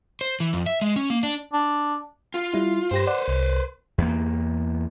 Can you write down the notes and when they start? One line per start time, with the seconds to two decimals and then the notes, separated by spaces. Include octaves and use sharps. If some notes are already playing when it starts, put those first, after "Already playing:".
0.21 C5
0.40 E3
0.53 F2
0.66 E5
0.82 G#3
0.96 C#4
1.10 A#3
1.23 D4
1.53 D4
2.34 F4
2.54 G3 E4
2.91 G2 G4 B4 C5 A#6
3.07 D5 F#5
3.28 C2
3.98 E2 A#3